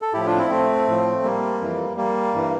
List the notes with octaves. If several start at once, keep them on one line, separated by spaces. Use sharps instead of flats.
A4
A2 F3 E4 G4
D4 F4
C4 E4
A3 C4
A2 F3
G3 A#3
F2 E3
G3 A#3
G2 E3